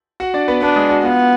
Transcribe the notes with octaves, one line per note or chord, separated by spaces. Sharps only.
F#4 F#5
D4 D5
B3 B4
B3 D4 B4
G#3 G#4
F#4
B3 F4